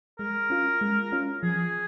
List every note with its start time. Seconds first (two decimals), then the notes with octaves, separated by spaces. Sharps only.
0.19 G#3 A#4
0.50 C#4 F4
0.81 G#3
1.12 C#4 F4
1.43 F3 G#4